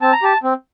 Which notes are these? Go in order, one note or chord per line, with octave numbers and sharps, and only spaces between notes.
C4 A5
A#5
G4 A5
C4